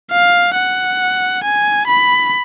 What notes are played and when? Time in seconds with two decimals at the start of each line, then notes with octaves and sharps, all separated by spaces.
0.11 F5
0.55 F#5
1.43 G#5
1.87 B5